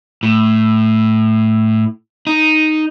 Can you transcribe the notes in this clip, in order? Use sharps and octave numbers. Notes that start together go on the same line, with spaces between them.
A2
D#4